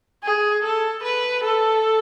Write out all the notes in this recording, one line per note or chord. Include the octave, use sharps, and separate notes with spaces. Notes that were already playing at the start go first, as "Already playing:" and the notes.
G#4
A4
B4
A4